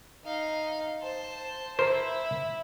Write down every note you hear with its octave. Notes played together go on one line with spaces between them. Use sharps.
D#4 F5
C5 A5
E4 A#4 C5